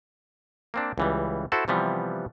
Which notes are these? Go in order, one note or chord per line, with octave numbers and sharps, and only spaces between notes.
A#3 C4 D4
C#2 E3 G3
E4 F#4 A4 C5
C3 E3 F3 G3 B3